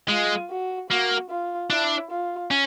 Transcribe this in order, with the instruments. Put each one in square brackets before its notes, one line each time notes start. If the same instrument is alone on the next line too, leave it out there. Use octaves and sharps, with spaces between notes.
[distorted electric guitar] G#3 [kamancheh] F4
[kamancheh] F#4
[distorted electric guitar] A#3 [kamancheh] F#4
[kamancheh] F4
[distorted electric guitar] D4 [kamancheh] E4
[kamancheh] F4
[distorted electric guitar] C#4